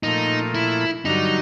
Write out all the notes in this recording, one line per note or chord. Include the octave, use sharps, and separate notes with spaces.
A#2 F3 A3 D#4
E4
G2 D3 F#3 D#4